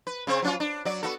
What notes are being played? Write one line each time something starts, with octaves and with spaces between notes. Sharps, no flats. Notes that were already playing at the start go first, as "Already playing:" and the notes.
B4
C#3 C4 C5
F#3 C#4 F4
D4
F#3 D5
B3 F#4 A4